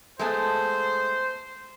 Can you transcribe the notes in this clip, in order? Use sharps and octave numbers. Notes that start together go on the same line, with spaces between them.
G#3 A3 B3 C5